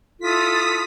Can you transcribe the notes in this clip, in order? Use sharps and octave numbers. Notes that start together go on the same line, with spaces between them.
E4 F4 A4 D#6 B6